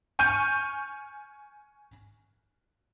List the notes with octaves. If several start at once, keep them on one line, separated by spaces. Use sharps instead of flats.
G#5 C#6 F6 G6 D#7